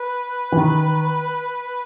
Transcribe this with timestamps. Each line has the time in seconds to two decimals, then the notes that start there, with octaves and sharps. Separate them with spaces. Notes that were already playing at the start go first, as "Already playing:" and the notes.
Already playing: B4
0.52 E3
0.57 D#3